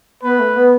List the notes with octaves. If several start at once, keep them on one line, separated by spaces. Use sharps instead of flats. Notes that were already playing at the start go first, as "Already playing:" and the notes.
B3 B4
A3
B3